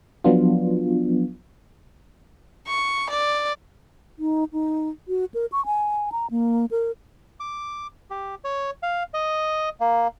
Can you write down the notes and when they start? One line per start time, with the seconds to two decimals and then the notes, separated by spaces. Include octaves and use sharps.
0.24 F3 F#3 B3 D4 F4
2.67 C#6
3.10 D5
4.19 D#4
4.53 D#4
5.08 F#4
5.34 A#4
5.52 C#6
5.66 G#5
6.12 A#5
6.31 A#3
6.71 A#4
7.40 D6
8.10 G4
8.44 C#5
8.83 F5
9.14 D#5
9.80 A#3